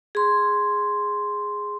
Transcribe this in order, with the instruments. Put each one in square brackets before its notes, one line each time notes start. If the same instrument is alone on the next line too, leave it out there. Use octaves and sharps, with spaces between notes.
[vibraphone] G#4 C6